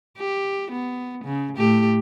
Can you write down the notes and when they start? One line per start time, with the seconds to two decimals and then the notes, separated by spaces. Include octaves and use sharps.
0.19 G4
0.71 B3
1.24 C#3
1.57 A2 A3 G4